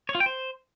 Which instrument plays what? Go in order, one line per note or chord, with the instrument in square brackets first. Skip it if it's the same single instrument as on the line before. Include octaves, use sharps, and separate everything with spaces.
[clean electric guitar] C#5
F4
G5
C5